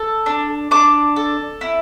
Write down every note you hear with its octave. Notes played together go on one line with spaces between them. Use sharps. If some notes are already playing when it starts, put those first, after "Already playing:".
Already playing: A4
D4
D4 D6
A4
E4